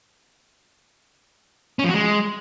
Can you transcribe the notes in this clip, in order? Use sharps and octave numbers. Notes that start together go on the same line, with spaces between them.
C#4
F3
F#4
G#3